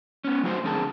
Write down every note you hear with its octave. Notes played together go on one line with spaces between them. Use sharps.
B3 C#4
F#3 A3 D#4 F#4 A4 C5
F2 D3 C4 G#4 A#4 A5